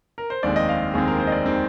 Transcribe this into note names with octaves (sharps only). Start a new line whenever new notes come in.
A#4
C5
F1 D#2 D#3 G#3 C4 D5
D#5
F5
F1 D#2 D#3 G#3 C4 G#4
A#4
C5
D#5
D5
D#3 G#3 C4